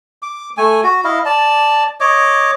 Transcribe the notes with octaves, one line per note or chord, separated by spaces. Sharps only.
D6
A3 G#5
F#4
E4 D#5 F5
D5 A5
C#5 D#5 D6